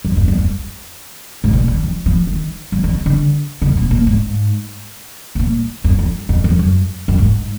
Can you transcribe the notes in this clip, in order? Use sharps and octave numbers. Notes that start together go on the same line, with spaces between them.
F#2
F#2
F#2
F#2
G#2
A#2
D#3
F3
F3
D#3
F#3
F3
D#3
D3
D3
A#2
B2
A#2
G#2
B2
A#2
F#2
F2
F2
F2
F#2
F#2
G#2